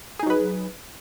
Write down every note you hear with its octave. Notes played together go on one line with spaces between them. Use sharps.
F#3 D#4 G#4 B4